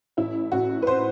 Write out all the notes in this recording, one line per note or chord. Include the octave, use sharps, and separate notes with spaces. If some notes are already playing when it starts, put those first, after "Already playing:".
A1 E4
A1 F#4
B4
C5